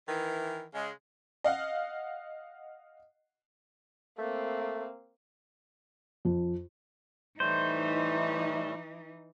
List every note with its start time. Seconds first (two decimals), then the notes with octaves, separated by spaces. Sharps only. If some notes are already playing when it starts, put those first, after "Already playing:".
0.08 D#3 E3
0.75 C#3 G#3
1.44 D#5 F5 F#5
4.18 A3 A#3 C4
6.25 F2
7.40 A2 E3 G3 A3 D#4 C5